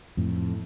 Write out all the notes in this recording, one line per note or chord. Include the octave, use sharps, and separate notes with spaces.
F2 A2